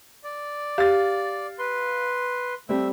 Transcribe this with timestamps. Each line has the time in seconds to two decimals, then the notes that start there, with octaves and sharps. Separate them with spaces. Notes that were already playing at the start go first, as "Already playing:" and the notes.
0.24 D5
0.78 G4 F5 A6
1.59 B4 C6
2.69 G3 A3 C4 E5